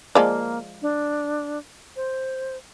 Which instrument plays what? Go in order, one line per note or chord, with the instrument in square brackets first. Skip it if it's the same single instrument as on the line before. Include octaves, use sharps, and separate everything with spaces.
[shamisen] F3 G#3 D5 [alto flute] A#3
[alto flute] D4
C5